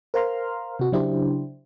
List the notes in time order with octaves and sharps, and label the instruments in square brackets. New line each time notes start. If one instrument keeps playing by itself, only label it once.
[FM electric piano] A#4 C5 F5 A#5 C6 F6
C3 F#4
C#3 F#3 D4 E4 G4 C5